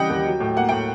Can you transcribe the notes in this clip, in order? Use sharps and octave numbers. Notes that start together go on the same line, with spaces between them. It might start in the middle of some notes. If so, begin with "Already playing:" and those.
Already playing: C#3 E3 G3 D#5 F#5 G5
D#2
F#3
A2
A#3 F#5
A2 G5